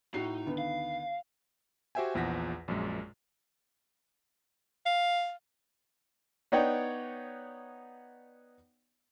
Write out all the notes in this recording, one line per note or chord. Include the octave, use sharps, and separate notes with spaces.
A2 D#4 F#4 C7
D2 D#3 B3
F5
F#4 G4 C5 E5 G5 G#5
A#1 E2 F3 F#5 A#6 B6
A#1 F#2 G#3
F5
B3 D#4 C#5 D5 F#5 G5